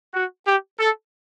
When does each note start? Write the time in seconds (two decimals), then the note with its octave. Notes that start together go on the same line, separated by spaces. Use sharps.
0.14 F#4
0.46 G4
0.79 A4